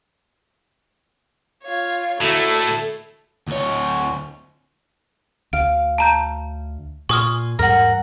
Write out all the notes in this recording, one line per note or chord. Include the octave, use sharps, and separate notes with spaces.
F4 C#5
D2 A2 A3 E4 A4 F#5 A#5
D2 C#5
D2 F5 D7
A5 A#5 G6
A#2 G#5 C6 C#6 D#6 F6
E2 G#2 G3 A#4 F#5